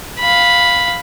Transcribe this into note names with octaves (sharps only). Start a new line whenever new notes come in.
F5 B5